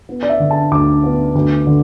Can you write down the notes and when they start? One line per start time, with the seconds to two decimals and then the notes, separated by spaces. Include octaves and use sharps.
0.09 B3
0.23 D5
0.29 E5
0.40 D3
0.51 A5
0.71 D2 D6
1.04 B3
1.35 D2
1.67 D3